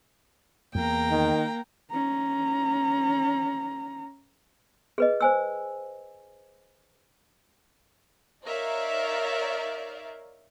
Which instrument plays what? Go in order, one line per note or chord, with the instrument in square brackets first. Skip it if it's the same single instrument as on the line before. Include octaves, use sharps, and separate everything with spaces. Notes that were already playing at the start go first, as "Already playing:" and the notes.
[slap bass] E2 [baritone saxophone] A#3 [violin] G5 A#5
[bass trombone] D#3
[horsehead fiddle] C#4 A#5
[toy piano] G#4 B4 D#5
C5 G#5 E6
[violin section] D#4 A#4 C#5 D5 E5 F5